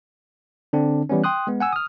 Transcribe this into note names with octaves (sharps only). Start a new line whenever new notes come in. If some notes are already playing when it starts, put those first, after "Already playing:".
D3 C4 D4
E3 G3 B3 C#4
G5 C6 D#6 F#6
G#3 B3
F#5 G#5 E6
D#6 F6